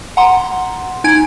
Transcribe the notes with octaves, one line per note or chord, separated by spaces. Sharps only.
F#5 A#5 C6
D#4 G#5 G#6 D7